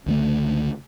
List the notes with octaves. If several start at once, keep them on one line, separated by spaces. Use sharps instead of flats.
C#2 D3 A3